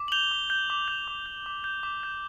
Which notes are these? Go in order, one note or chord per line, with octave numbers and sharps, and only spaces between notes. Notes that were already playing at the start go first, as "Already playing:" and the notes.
Already playing: D6
F#7
G6 F7 G7
D6
G6
D6
G6
D6
G6
D6
G6
D6
G6